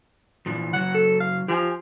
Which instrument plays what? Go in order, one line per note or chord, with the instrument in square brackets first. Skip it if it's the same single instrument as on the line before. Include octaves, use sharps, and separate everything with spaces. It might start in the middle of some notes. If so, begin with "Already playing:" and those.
[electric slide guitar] A#2 E3 F3
[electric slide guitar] C#3 F#3 [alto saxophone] F#5
[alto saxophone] A4
F5
[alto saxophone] F3 [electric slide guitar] G4 G#5